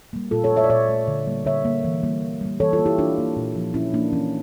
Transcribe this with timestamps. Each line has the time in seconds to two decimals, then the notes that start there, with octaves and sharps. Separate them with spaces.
0.13 G3 A#3
0.31 A#2 F4 A4
0.44 A4 C#5
0.50 A3
0.57 C#5 E5
0.64 D5
0.70 A#2 C#5 E5
0.89 A3
1.08 D3
1.27 G3 A#3
1.45 D3 C#5 E5
1.65 G3 A#3
1.85 E3
2.03 G3 A#3
2.23 E3
2.41 G3 A#3
2.60 E3 A4 C#5
2.73 F4 A4
2.79 A#3
2.86 E4 G4
2.98 E3 D4 F4
3.18 A#3
3.36 A#2
3.55 F3 A#3
3.74 A#2 C#4 E4
3.94 F3 A#3 D4
4.13 E3 C#4